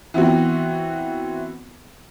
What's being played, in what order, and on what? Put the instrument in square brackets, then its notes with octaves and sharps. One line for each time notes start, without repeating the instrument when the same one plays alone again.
[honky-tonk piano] E3 B3 C4 F#4